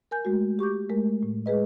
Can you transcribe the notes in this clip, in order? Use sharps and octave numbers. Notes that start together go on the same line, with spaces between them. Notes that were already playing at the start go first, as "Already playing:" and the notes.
A#4 G#5 G6
G#3 A3 F#4
G4 C#6 D6 G6
G#3 A3 A#4
A2
G#3 G#4 B4 D#5